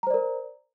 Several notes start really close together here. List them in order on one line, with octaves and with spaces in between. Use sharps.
A#5 C5 D5 A#4